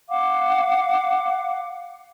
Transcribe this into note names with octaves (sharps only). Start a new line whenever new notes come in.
F5 F#5 D6